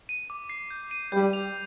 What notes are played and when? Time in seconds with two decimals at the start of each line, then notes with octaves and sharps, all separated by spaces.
0.09 D#7
0.30 D6
0.49 C7
0.70 G6
0.91 D#7
1.12 G2 G3 G6
1.33 F7